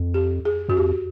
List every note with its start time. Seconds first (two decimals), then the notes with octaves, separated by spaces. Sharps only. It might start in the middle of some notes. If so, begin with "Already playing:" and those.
Already playing: F2
0.14 G4
0.45 G#4
0.69 F#2 F#4
0.77 F2 G4